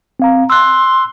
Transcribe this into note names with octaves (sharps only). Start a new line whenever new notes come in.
C4 F5 A#5
C6 E6 F#6